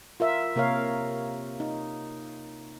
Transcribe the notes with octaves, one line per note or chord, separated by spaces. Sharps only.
F4 A#4 E5
C3 A#3 A#4 C#5 F5
D#4